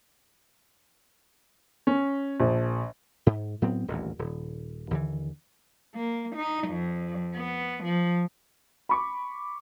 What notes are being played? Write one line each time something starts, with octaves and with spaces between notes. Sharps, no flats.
C#4
A#1
G#2
A2 F#3 B3 C4
D#1 A1 D2
D#1
D#2 D3 E3
A#3
D#4
F2
B3
F3
B5 C#6 D6